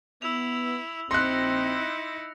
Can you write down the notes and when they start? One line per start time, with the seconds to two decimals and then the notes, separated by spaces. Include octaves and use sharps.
0.22 B3 E4 E6 F7
1.11 A#1 C4 D#4 E4 C6 F#6 A#6 C#7